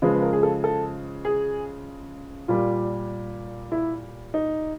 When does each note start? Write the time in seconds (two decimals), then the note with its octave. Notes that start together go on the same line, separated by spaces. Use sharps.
0.02 C#3 F3 G#3 B4
0.12 B4
0.22 A#4
0.33 G#4
0.43 A4
0.64 A4
1.25 G#4
2.48 A#2 G3 F4
3.72 E4
4.34 D#4